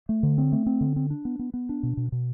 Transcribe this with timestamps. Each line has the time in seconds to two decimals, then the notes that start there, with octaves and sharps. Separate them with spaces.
0.09 A3
0.23 D3
0.38 C4
0.52 A3
0.66 C4
0.81 D3
0.96 C4
1.10 D4
1.25 B3
1.39 B3
1.54 B3
1.69 D4
1.83 B2
1.97 B2
2.12 B2